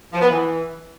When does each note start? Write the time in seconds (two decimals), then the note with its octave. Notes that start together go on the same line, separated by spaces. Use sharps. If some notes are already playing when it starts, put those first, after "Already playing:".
0.12 F3
0.21 B3
0.30 E3